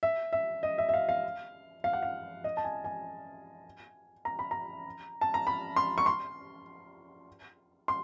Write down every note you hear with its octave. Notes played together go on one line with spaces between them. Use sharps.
E5
E5
D#5
E5
E5
F5
F5
F5
F#5
F5
D#5
A5
G#5
G#5
A#5
B5
A#5
A5
A#5
B5
C6
C#6
C6
C6